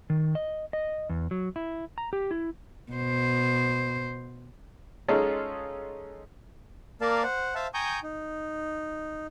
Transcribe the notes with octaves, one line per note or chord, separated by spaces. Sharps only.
D#3
D#5
D#5
E2
F#3
E4
A#5
G4
E4
B2 C5
G#3 C#4 D#4 F4 G#4 A4
A#3 A#4 D5 F5 A5
C5 F#5
C5 E5 F5 A5
G5 G#5 A#5 C#6 D#6 G6
D#4